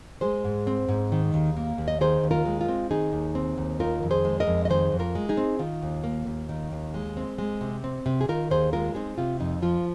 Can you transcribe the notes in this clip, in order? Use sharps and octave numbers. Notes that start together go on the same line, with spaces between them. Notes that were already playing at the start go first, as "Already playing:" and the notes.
G#3 G#4 C5
G#2
C4
G#2
D#3
D#2
A#3
D#2
D#5
D#3 G#4 C5
D#2
F4 A#4
G#3
F4
C4
D#3 D#4 G#4
D#2
C4
D#2
D#3 F4 A#4
F2
G#4 C5
G#3
A#4 D#5
F2
D#5
D#3 G#4 C5
F2
F4 A#4
G#3
D#4 G#4
C4
D#3 F4
D#2
A#3
D#2
D#3
D#2
G#3
C4
G#3
C3
C4
C3
G#4
D#3 F4 A#4
D#2 G#4 C5
G#3 F4 A#4
C4 D#4 G#4
C3 F4
F2 D#4
F3 F4